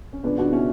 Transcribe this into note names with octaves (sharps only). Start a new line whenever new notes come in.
C#4
C#2 B3 D4
C#2 D4 F#4
B2 C#4 E4